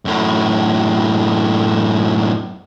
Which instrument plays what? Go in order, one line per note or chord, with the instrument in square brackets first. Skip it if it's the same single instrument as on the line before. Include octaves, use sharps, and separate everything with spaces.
[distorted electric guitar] F#2 A2